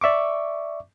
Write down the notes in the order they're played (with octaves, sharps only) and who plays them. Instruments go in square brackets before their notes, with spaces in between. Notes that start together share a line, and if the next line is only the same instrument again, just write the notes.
[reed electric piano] D5 E5 C#6 D6